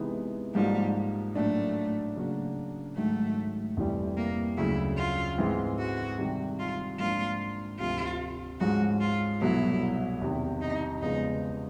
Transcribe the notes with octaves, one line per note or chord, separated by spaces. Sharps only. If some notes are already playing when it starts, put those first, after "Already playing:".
Already playing: C3 E3 G#3 B3 D#4
G#2 F3 G3 A#3 D#4 F#4
A2 F#3 A3 A#3 D4
C#3 F#3 A#3 D4 F#4
G#2 D#3 F#3 A3
F2 C3 E3 G3
A#3
D2 C#3 F#3 E4
F4
G#2 E3 G#3 C4 E4
F#4
C3 D#3 G3
F4
G#2 F3 A#3 D4 F4
D2 C3 F3 F4
G#2 F3 G#3 C#4 F#4
F4
C2 B2 F#3 A3 E4
E2 C3 D#3
D#4
E2 C#3 F3 G#3 B3 D#4